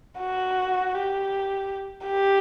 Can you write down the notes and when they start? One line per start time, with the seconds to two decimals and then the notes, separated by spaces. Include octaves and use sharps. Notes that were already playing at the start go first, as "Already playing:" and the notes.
0.19 F#4
0.95 G4
2.07 G4